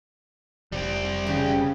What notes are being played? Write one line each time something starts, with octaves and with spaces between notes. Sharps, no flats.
F1 G3 C4
C#3 G4